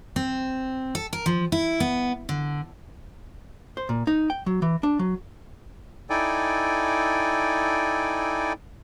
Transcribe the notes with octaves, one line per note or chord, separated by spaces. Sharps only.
C4
A4
A#4
F3
E4
B3
D3
C5
A#2
D#4
G5
F#3
E3
D4
F#3
D#4 E4 A4 D5 G5 G#5